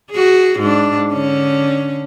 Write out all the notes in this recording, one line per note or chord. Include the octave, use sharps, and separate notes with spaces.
F#4 G#4
G#2 D4
D3 C#4